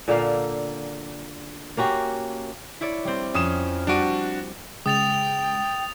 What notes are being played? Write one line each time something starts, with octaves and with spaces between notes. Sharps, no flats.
A#2 D3 A#3 F5
A#3 C#4 F#4 G4
E4 C#5 D5
G3 C4
F2 C#4 D#6 E7
G3 D4 F#4 G4 D7 D#7
C#3 G#3 G5 D#6 A6 F7